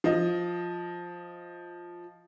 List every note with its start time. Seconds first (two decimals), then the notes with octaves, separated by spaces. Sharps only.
0.04 F3 D#5